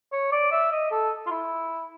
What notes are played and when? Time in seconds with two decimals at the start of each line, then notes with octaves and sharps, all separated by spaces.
0.12 C#5
0.32 D5
0.52 E5
0.72 D#5
0.91 A4
1.27 F4
1.31 E4